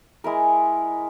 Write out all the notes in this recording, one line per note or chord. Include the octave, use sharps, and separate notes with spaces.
G#3 E4 A#4